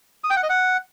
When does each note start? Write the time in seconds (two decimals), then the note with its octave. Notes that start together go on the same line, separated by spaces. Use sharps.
0.24 D#6
0.30 G5
0.37 F#5
0.43 D#5
0.50 F#5